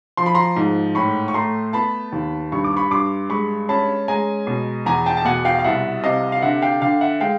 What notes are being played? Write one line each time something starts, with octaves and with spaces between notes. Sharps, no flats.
F3 C6
B5
A#5 C6
G#2
A2 B5 C#6
C#6
A3 A#5 C6
B3 A5 B5
D#2
G2 C#6
D6
B5 C#6
G2 C6 D6
G#3 B5 C#6
C#4 A5 B5
G#3 G#5 A#5
B2
E2 G#5 A#5
G5 A5
A5
B2 F#5 G#5
F5 G5
F5
C2 E5 F#5
C3 D#5 F5
F5
D3 E5 F#5
F5 G5
D3 F5 G5
E5 F#5
G#3 F5 G5